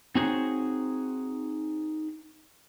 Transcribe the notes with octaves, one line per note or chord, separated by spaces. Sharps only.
C4 D#4 F#4 G#4 C5 C#5